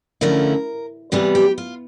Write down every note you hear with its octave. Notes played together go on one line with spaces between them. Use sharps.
D3 F3 A3 C#4 E4 A#4
C3 E3 G3 B3 G#4
G4
F4